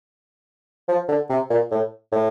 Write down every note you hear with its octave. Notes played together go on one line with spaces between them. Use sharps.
F3
D3
C3
A#2
A2
A2